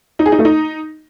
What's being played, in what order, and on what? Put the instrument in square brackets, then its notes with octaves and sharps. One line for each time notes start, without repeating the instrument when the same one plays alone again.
[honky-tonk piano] D#4
G#4
D#4
A3
D#4